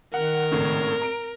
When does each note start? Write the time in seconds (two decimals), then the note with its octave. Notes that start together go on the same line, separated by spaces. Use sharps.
0.14 D#3 A#4 F#5
0.51 G#1 A2 C#3
1.02 A#5 D7